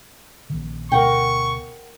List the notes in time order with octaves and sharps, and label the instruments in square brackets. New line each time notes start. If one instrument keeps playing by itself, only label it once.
[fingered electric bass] A#1 D#3
[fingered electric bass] D2 B2 [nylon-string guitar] A#4 F#5 G5 [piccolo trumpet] C#6